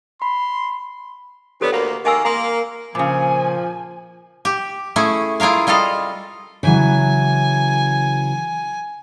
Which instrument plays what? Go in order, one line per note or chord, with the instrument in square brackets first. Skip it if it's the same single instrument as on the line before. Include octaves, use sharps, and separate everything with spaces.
[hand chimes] B5 [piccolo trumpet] C6
[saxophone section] A#2 D3 B3 [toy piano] G4 A4 C#5
[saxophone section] D2 A#3 [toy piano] F#5 B5
[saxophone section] D#3 A#3 [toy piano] D#5 G#5 E6
[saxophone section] A#3 [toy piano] A#5 C6 D#6
[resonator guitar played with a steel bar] A#2 C#3 [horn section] F3 [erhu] G#5
[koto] G4
A3 C#4 E4 G#4
E4 F4 G#4 A#4 F5
G3 F4 A4 D#5 F5
[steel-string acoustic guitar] C#3 E3 F#3 [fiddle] G#5